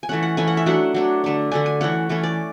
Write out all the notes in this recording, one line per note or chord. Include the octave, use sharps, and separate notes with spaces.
G#5
E3 A3 C#4 F#5
F#5
E3 A3 C#4 G#5
F#5
E5
F#3 A3 D4 F#5
F#3 A3 D4
D3 A3 D4
D3 A3 D4 G#5
G#5
E3 A3 C#4 F#5
E3 A3 C#4
D5